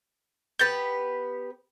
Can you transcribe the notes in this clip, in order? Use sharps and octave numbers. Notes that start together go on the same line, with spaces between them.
B3 G4 B4 G6 A6